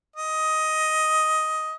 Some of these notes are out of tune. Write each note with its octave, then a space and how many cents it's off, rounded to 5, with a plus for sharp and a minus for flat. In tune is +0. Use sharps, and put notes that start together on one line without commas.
D#5 +10